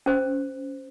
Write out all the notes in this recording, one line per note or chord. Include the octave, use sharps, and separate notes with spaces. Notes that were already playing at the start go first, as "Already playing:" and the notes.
C#4 C5